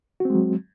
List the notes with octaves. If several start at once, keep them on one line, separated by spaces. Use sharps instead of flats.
F#3 G#3 C4 F#4